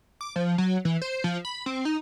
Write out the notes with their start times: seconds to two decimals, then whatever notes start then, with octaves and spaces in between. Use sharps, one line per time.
0.21 D6
0.36 F3
0.58 F#3
0.85 E3
1.02 C5
1.24 F3
1.45 B5
1.66 C4
1.85 D#4